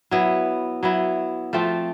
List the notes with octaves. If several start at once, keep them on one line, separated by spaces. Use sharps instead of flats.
F#3 B3 E4
F#3 B3 E4
F3 A3 C4 F4